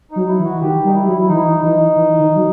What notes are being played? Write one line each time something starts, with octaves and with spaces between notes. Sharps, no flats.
F#3 D#4
E4
E3
F#4
D#3 G4
G3 D#4
E4
F#3
E4
E3 D#4
E3 D#4
E3
D#3
F#3